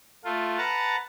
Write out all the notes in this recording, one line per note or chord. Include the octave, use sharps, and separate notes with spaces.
A3 F4
B4 F#5 A5 A#5